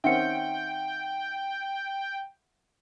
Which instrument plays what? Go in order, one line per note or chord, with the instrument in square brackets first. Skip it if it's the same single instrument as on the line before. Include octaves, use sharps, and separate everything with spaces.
[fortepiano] D#3 C4 C#4 [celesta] E5 F#5 C#7 [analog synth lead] G5